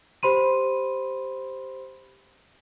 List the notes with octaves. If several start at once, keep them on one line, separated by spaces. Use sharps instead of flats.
G4 C5 B5 C6 D#7